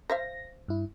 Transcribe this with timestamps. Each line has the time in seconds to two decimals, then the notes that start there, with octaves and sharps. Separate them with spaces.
0.10 C5 E5 F5 A#6
0.68 G2 E4